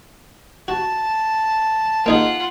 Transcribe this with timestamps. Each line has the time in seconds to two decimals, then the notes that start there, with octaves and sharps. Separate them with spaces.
0.68 F#4 A5
2.06 A#3 D#4 F4 G#4 F#5